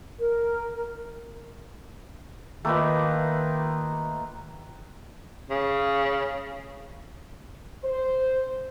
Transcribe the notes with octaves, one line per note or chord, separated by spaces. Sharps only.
A#4
D#3 A3 A#3 F4 B4 D#5
C#3
C5